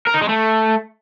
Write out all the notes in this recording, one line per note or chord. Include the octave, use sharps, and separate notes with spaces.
A#4
D#4
G#3
A3